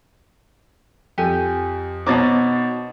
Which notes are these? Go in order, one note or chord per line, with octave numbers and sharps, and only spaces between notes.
F2 G4 A4 G#5
B2 D#4 C5 C#5 A5 D6 A6